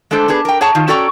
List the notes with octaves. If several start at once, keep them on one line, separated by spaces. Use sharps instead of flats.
G#3 A3 D4 A4 C5
B3 D4 G#4 B4
A#4 G5
G#4 C#5 F#5 A5 A#5
D#3 F4
C#4 F#4 A4 D5 G5 A#5